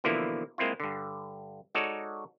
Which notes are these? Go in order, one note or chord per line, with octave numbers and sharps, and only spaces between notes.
B2 D3 E3 F3 A#3 E4
G#3 A#3 C4 E4 F4
G2 D3
G#3 D#4 F#4 A4 C#5 D5